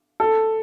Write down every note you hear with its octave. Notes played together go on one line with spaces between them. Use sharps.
A4